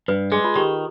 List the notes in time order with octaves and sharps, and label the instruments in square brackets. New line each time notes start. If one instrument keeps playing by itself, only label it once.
[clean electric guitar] G2 [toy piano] B4
[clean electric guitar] G#3 [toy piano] G#4
[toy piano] F4
[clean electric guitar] D#3 [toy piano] G4